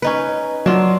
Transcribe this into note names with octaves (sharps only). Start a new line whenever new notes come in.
C#4 D#4 B4
F#3 D4 F4